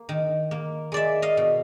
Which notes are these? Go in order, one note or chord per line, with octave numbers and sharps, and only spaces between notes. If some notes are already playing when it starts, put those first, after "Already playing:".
Already playing: A#3
D#3
A#3
G#3 D5 E5
D#5 F5
B2